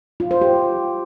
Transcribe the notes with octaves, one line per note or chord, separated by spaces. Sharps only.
F4
C5
G4